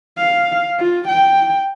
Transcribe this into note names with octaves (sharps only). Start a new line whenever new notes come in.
F5
F4
G5